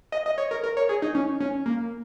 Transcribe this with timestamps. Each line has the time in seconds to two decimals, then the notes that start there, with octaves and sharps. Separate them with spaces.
0.12 D#5
0.26 D#5
0.38 C#5
0.51 A#4
0.63 A#4
0.77 C#5
0.89 G#4
1.02 D#4
1.15 C#4
1.40 C#4
1.66 A#3